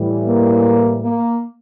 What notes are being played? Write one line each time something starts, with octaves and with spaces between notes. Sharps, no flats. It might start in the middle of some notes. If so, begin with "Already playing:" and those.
Already playing: A2 E3 G3
A#3
A#3